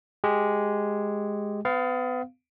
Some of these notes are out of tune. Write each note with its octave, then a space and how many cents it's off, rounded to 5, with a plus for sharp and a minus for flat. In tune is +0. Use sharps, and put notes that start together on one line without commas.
G#3 +0 G4 +0
B3 +35 F5 +0